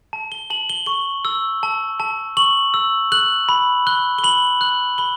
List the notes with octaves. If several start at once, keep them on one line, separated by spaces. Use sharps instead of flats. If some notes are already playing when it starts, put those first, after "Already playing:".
A5
G7
A5 F#7
G7
C#6 G7
E6
A5
A5
C#6 F#7
E6
F#6 F#7
B5
F#6 G7
G7
B5 F#7
F#6 F#7
B5 G7